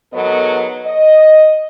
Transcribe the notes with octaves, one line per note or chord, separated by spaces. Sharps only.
G#2 F#3 B3 A4 A#4 D#5
D#5